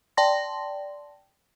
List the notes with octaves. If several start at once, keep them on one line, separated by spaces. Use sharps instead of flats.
D5 G5 A5 C6 A#6